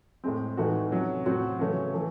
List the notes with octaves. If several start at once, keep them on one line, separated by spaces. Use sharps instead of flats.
A2 G#3 C4
A2 E3 A3 D#4 F#4
C3 F#3 C#4 F#4
A2 F#3 C4 F#4
C#3 E3 A3 C#4
E3 A3